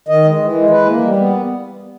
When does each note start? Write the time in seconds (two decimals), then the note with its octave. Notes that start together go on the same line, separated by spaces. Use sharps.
0.09 D#3 D#5
0.24 G#3
0.39 E3
0.54 G#3
0.70 E3 B4
0.85 A#3
1.01 G3
1.16 B3